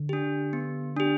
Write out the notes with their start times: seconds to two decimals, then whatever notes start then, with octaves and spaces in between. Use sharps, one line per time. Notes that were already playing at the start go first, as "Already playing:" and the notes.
Already playing: D3
0.09 D4 G4
0.53 B3
0.97 D4 G4